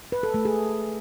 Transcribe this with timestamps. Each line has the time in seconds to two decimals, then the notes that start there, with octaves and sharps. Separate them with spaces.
0.12 B4
0.23 A4
0.34 A3
0.45 G#4